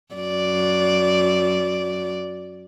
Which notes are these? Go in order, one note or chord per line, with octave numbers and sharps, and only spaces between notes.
F#2 D5